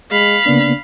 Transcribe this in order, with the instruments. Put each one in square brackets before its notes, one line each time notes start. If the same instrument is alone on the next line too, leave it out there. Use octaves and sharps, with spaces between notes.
[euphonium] G#3 [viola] F5 B5
[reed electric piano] C#3 A#3 B3 [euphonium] D4